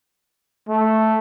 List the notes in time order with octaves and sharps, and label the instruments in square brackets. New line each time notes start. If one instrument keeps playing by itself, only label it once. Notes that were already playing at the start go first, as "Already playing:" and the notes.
[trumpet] A3